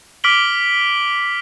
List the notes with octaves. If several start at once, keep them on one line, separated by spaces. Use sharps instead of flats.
D6 F6 B6 D7 F#7 G7